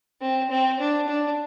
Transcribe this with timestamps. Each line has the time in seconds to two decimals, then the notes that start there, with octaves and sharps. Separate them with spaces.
0.21 C4
0.50 C4
0.80 D4
1.08 D4